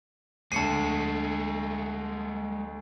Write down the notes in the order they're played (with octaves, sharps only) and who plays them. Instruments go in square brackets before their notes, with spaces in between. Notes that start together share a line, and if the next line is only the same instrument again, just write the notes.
[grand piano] D2 C#7 D#7 [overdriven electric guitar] G#3 A3 [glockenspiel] A5 C7